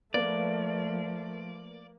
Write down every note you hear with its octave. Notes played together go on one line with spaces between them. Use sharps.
F3 A3 A#3 B4 D5